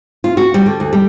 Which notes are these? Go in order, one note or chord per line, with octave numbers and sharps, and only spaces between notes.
F4
F#4
G3
D3
D2
G3